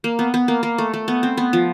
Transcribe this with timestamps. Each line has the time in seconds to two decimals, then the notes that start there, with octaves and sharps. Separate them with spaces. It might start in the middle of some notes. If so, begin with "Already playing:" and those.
0.04 A#3
0.19 B3
0.34 B3
0.48 A#3
0.63 A#3
0.78 A3
0.94 A3
1.08 B3
1.23 C4
1.37 B3
1.53 F3